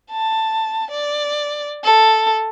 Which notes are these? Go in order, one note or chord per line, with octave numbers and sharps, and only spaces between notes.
A5
D5
A4